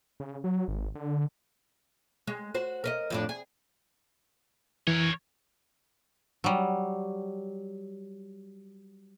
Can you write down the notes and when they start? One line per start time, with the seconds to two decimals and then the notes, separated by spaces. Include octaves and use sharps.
0.20 C#3
0.44 F#3
0.68 G#1
0.95 D3
2.27 G#3
2.55 F#4 C5
2.84 A#4 B4 D#5
3.10 F2 A2 D4
3.29 G#4
4.88 E3 A#4 C#5
6.44 F#3 G3